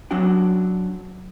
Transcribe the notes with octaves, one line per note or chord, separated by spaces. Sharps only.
F#3 C#4 D4 F#4 G5